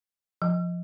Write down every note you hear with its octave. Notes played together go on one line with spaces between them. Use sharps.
F3